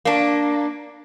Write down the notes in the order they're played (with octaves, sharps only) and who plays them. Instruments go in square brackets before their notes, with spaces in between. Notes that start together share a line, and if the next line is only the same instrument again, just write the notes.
[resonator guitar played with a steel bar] A#3 D4